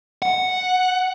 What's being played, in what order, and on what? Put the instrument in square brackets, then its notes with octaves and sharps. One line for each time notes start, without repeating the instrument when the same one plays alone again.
[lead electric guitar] F#5